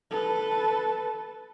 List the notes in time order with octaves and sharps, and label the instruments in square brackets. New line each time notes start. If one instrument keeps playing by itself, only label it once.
[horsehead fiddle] A4 B4